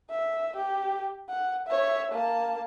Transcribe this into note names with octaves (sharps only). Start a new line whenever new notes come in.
E5
G4
F#5
C#5 E5
A#3 A5